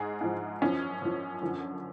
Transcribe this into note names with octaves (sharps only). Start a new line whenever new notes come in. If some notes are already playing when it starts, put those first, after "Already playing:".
Already playing: G#2 G#4
G#2 F3
F#2 F3 C#4
F#2 F3
F#2 D3 F3